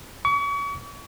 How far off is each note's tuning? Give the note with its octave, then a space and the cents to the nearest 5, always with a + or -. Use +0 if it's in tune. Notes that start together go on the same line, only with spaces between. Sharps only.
C#6 +40